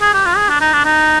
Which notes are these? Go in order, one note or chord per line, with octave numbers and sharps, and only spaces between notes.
G#4
G4
F4
G#4
D4
D#4
D4
D#4